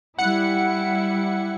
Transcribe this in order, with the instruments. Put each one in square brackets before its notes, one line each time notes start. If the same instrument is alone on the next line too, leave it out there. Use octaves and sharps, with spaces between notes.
[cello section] G3 E4 [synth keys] F#5 C#7